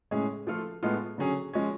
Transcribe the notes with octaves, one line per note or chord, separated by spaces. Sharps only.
A2 G#3 C#4 G#4
F3 A3 F4 A4
A2 G#3 B3 F4 A4
D3 F#3 C#4 G#4
F3 G#3 C#4